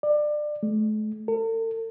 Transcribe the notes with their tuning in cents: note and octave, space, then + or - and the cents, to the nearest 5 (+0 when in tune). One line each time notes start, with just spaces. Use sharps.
D5 +25
A3 -40
A4 +45